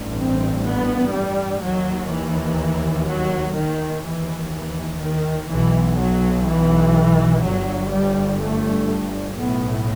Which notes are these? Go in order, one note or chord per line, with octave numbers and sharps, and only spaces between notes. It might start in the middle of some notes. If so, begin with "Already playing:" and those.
Already playing: A1 G2
C4
B3
G3
D#2 F#3
E3
F#3
D#2 D#3
E3
E3
D#3
B1 B2 E3
F#3
E3
G1 G2 F#3
G3
A3
B1 A2 B3